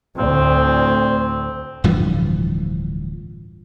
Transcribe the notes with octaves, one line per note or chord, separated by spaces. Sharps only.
D2 A2 C4
D1 G2 E3 F3